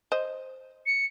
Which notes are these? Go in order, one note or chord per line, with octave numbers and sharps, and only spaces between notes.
C5 D#5
C#7